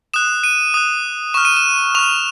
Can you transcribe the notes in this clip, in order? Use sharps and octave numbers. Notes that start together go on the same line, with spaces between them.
D#6 F#6 E7
D#7
D#6 F#6
C#6 F6 E7
D#7
E7
C#6 F6 F7